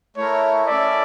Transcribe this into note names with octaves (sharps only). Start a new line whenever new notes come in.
A3 E4 A#4 C#5
C#4 E4 A4 D5 E5